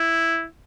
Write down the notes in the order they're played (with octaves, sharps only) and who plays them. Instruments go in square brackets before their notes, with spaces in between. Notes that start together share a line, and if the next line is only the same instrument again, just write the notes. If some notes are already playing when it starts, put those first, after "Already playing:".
Already playing: [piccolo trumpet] E4